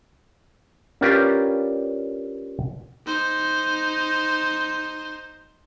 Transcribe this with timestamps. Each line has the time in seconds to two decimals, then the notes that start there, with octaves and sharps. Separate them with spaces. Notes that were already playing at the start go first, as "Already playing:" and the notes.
1.01 C#4 D4 F4 G4 A#4 B4
3.06 D#4 C5